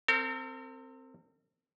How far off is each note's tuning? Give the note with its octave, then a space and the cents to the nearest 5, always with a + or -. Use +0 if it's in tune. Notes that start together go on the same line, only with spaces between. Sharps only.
C4 +0 A#4 -45